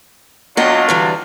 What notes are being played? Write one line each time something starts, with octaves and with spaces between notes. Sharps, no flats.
F#3 B3 D4 F4 D#5 G5
D3 E3 G3